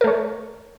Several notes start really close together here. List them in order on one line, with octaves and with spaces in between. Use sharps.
A#4 A3 C#5